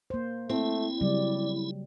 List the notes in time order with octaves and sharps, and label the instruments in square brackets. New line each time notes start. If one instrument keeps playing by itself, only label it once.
[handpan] A#3 C5
[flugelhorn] A3 [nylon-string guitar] C4 [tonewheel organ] E4
[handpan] C#3 F#3 G3 [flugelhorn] D5